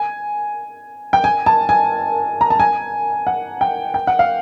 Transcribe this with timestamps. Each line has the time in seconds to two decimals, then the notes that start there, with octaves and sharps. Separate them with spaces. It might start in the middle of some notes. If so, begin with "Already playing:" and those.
Already playing: G#5
1.13 G5
1.24 G#5
1.46 A5
1.69 G#5
2.41 A#5
2.50 A5
2.60 G#5
3.27 F#5
3.61 G5
3.94 G5
4.07 F#5
4.19 F5